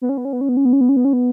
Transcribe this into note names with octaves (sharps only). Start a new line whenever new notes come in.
B3
C#4
B3
C#4
B3
C#4
B3
C#4
B3
C#4
B3
C#4
B3
C#4
B3